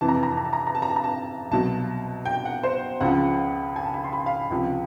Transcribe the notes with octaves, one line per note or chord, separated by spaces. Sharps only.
F2 C3 E3 A5
A#5
A5
A#5
A5
A#5
A5
A#5
A5
A#5
A5
A#5
A5
A#5
A5
C2 B2 F#3 A5
G5
F#5
C5
C#2 C#3 F3 F#5
G#5
A5
B5
C6
B5
F5
C#2 C3 F3